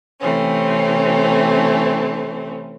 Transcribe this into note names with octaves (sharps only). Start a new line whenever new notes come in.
C3 E3 A3 C4 C#4